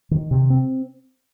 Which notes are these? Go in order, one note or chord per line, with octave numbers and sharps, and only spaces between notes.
D#3
C3
C4